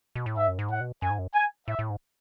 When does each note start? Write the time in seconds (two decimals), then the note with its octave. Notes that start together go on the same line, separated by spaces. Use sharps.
0.15 B2
0.26 A2
0.37 G#2 E5
0.48 F#2
0.59 G#2
0.69 A2 F#5
0.81 B2
1.02 F#2 G#5
1.10 G#2
1.19 F#2
1.34 G#5
1.68 A2 E5
1.79 A2
1.90 G#2